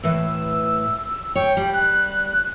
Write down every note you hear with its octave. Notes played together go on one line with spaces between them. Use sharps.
A2 E3 B4 E6
C#5 G5
G3
F#6